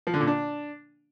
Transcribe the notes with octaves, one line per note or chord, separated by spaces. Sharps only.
F3
D3
A#2
D4